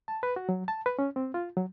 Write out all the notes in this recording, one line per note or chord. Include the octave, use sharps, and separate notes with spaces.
A5
B4
F#4
F#3
A5
B4
C#4
C4
F4
F#3